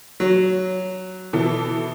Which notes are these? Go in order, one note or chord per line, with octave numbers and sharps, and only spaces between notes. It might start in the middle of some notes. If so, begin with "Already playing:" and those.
F#3
B2 E3 A4